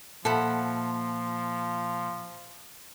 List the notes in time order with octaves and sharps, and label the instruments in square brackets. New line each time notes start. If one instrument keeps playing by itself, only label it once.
[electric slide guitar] A#2 E5 [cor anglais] F3 [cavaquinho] A4 F#5 B5